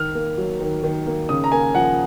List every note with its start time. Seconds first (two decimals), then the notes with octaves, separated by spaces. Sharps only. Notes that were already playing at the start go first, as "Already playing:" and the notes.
Already playing: D#3 F6
0.15 A#3
0.38 F#3
0.60 D#3
0.83 D#3
1.07 A#3
1.29 C#3 D#6
1.44 A#5
1.52 A#3 G#5
1.75 F3 F#5